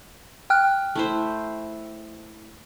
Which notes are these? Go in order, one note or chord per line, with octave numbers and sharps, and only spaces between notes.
G5 F6 F#6
A3 E4 C5